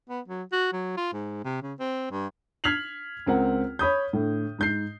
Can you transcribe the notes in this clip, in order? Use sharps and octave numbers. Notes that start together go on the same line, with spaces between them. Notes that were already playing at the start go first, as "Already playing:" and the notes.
B3
F#3
F#4
F#3
F4
G#2
C3
C#3
C4
G2
F6 G#6 B6 C7 F7 F#7
C#2 C4 A#4 F#5
C#5 B5 D#6 G6
A2 D3
G#2 G6 C7